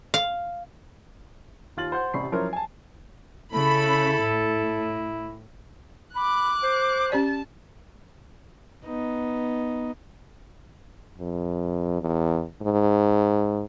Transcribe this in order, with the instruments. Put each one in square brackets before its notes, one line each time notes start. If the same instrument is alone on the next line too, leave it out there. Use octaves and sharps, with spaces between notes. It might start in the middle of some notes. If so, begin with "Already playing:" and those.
[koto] F5
[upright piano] D#2 F4 A6 F#7
C5 F#5 G6
A1 C3 D5 B5 C#6 C7
F3 F#3 C#4 E4 A#4 C5
G#5 A5
[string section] C#3 B5 [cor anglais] E4 [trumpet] A4
[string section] A2
[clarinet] B5 [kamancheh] D6 F#6
[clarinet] C5
[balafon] C#4 G4 D5 [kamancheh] A5
[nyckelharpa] B3 D#4
[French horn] F2
E2
G#2